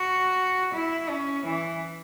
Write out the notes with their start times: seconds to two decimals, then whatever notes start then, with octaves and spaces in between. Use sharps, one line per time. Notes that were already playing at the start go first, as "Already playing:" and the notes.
Already playing: F#4
0.74 E4
1.09 C#4
1.46 E3